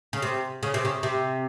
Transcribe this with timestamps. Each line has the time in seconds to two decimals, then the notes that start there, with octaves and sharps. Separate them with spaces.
0.13 C#3
0.22 C3
0.63 C#3
0.74 C3
0.85 C#3
1.03 C3